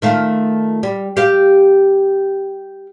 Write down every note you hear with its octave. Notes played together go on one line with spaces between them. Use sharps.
D#3 A3 F4
G3
G4 F5